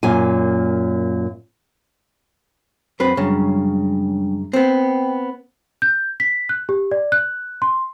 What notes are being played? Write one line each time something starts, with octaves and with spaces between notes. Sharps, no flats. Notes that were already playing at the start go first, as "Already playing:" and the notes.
F#2 A#2 A#3 G#5
F#2 C4 B4
F#2 C#3 G3 G#3 D4
B3 C4 G5
G6
B6
F#6
G4
D5
F#6
C6